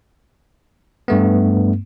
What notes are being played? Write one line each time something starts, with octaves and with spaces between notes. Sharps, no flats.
G2 A3 B3